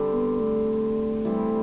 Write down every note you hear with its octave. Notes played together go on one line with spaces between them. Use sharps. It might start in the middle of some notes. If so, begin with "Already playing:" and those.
Already playing: D3 G3 C4
B3
A3
E3 G3 C4